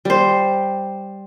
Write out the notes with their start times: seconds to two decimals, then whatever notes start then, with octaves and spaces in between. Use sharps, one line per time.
0.05 G3 C5